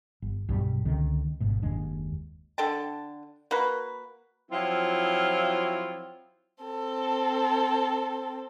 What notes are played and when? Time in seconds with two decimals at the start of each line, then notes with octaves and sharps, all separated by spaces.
0.22 G1
0.49 B1 G2 B2 G3
0.86 C#2 D3 D#3 C4
1.40 G#1 G#2 B2
1.62 F#1 D#2 G#3 D4
2.58 D3 A4 G5 A5
3.51 A#3 F#4 B4
4.51 F3 F#3 C4 E4 F4
6.64 C4 A4